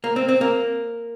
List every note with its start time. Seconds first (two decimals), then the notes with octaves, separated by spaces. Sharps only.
0.04 A#3
0.16 C4
0.29 C4
0.41 A#3